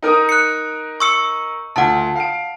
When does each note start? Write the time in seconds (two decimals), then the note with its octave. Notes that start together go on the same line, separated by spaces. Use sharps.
0.02 D#4 A#4 D#6
0.29 F#6 C#7
1.00 C#6 E6 C#7
1.76 D2 F4 F#5 A5
2.16 F5 D7